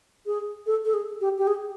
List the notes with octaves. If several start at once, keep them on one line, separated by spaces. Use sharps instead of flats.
G#4
A4
A4
G#4
G4
G4
G#4